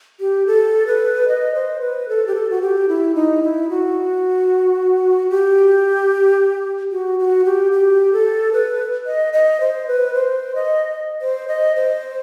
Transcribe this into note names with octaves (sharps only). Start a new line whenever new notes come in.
G4
A4
B4
D#5
C5
B4
A4
G4
A4
F#4
G4
E4
D#4
E4
F#4
G4
F#4
F#4
G4
G4
A4
B4
D#5
D#5
C5
B4
C5
D#5
C5
D#5
C5